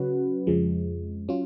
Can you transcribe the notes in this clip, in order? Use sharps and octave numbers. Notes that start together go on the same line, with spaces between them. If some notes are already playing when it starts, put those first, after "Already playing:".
Already playing: C#3 F#3 C#4 F#4 B4
F2 C#3 F3 G#3
F#3 C#4 F4